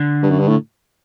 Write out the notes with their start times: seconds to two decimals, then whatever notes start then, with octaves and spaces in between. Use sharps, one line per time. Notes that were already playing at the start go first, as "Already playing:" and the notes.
Already playing: D3
0.23 G2
0.31 F#2
0.40 G2
0.48 A2